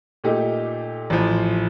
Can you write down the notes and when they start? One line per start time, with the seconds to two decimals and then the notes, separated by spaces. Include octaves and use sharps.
0.24 A#2 A3 D#4 G4
1.10 A1 A2 F3